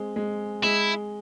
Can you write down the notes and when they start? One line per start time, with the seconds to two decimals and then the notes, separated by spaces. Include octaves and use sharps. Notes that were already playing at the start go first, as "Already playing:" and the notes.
Already playing: G#3 C4
0.16 G#3
0.63 G#3 E4